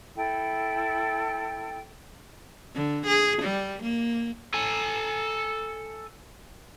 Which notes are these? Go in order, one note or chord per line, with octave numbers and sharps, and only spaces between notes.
E4 A4 G5
D3
G#4
G3
A#3
A4 G#5